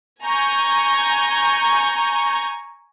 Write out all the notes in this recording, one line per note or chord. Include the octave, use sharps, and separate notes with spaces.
G#5 A#5 C#6 G6